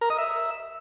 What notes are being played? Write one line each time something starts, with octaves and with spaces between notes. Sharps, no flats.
A#4
D#5
E5